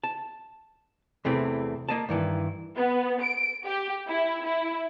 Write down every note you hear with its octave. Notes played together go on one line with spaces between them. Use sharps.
A5
E2 C3 E3 A3 C4
A#3 D#5 A5
G2 D#3 E3
B3
D7
G4
E4
E4